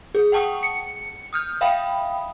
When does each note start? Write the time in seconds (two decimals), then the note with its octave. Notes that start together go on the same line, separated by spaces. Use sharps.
0.15 G#4
0.32 F#5 G5 A5 C#6 D#6
0.63 C#7
1.33 D#6 F6 G6
1.61 E5 F5 G5 B5 D#6